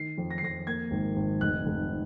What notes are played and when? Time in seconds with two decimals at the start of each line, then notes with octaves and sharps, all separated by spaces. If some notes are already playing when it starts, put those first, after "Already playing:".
Already playing: D#3 C7
0.18 F2
0.31 A#6
0.38 C7
0.43 F2 A#6
0.67 A#3 G#6
0.91 G#1
1.16 G#1
1.41 F1 F#6
1.66 F1